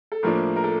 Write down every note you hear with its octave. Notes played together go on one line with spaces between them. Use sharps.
A4
A2 F3 A#3 D4 A#4
A#4
A4